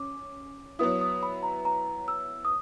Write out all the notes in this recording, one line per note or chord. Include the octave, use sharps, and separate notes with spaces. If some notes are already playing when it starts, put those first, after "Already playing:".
Already playing: C#4 D6
F#3 B3 E4 D#6
D#6
B5
A#5
A#5
E6
D#6